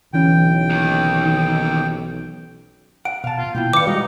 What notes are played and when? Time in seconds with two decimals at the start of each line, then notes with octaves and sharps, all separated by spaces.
0.13 B1 D3 E3 C#4 G5
0.70 D#2 D#3
3.05 F#5 D7
3.24 B2 F5 A5
3.38 F4
3.55 B2 A#3 E4 F4 G5
3.73 D#3 B4 D5 F5 D6 C#7
3.87 G3 G#3 D#4 F#4